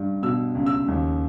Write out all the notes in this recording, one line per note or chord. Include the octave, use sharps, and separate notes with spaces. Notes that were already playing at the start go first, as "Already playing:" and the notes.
Already playing: G2
B2 E6
C#2
E6
D#2